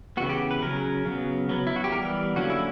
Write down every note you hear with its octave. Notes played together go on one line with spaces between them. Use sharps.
C#3 E3 B3 F#4
G4
B4
C#3 F#3 C#4 A#4
C#3 F#3 B3
F#3 B3
E4
F#4
G4
E3 G3 B3 A#4
D3 F#3 A#3 C#4 F#4
E4